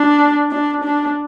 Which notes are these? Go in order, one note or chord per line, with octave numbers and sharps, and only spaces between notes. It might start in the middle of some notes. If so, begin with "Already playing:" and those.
Already playing: D4
D4
D4